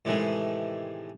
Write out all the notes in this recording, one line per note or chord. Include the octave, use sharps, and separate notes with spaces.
A2 C3 D#3 E3 G#3 A3